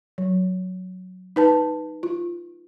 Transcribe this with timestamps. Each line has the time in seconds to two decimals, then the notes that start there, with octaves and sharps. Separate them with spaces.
0.18 F#3
1.36 D#4 B4 A5
2.03 F4